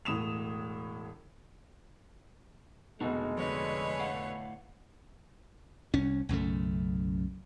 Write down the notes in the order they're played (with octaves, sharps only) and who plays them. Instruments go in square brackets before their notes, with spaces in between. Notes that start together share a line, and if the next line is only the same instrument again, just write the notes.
[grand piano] E1 A2 D#6 E7 F7
[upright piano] F1 B2 [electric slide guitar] D3 D#4 F#4 [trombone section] G#3
[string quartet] D3 B4 C#5 [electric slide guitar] F3 D#5
[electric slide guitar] A2 F5 F#5
[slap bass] C2 C#4
B1 F#2 C#3 A3